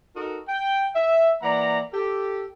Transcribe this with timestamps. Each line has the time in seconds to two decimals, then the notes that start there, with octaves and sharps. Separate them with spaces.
0.15 D#4 F#4 A4 A#4
0.48 G5
0.95 E5
1.43 E3 A#3 D5 F#5 A#5
1.93 G4 A4